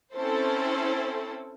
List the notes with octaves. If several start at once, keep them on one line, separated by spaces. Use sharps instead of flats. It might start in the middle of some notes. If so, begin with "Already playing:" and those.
C4 C#4 E4 A4 C5